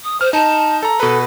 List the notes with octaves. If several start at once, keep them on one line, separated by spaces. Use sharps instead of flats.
D#6
C5 F6
D#4 A5
A4 A#5
B2 A4 B4